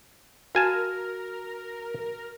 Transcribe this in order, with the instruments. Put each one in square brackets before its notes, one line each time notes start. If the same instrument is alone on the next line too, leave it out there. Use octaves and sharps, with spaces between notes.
[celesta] F#4 F6 [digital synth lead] A#4 [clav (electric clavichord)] F5 G#5 A5